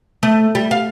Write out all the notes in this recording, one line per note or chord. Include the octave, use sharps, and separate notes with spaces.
A3
G3
F5